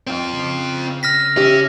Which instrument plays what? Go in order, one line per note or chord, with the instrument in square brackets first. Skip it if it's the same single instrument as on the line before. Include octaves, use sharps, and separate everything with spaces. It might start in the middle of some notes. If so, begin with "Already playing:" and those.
[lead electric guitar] C4 F4
[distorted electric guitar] C#3
[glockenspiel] F6 A#6 B6
[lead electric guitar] C#4 [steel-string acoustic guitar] G4 E5